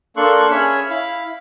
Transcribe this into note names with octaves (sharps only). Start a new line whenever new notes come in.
A#3 D4 A4 C6 C#6 F#6
C#4 G#4 C#5 E5 B5
E4 F5 B5